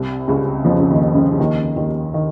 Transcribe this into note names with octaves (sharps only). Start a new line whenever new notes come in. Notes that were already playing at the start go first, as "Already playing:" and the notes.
Already playing: C2 C3
C#2 C#3
F2 F3
C#3
D#2 D#3
C#2 C#3
C#3
D#2 D#3
D#2 D#3
D#3